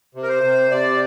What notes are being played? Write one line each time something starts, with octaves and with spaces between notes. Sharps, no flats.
C3
A#4
C5
C3
C3 D5